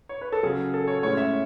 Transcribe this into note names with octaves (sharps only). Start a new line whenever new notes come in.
C#5
B4
A4
C#3 F#3 C#4 G#4
A4
C#5
A2 G#3 C#4 C#5
E5